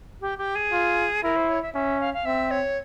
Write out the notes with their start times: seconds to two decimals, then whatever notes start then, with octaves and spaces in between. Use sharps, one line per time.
0.21 G4
0.38 G4
0.55 G#4
0.72 F4
1.23 E4 A#4
1.36 C5
1.49 C#5
1.62 E5
1.74 C#4 E5
2.00 F5
2.14 F5
2.25 C4 E5
2.51 C#5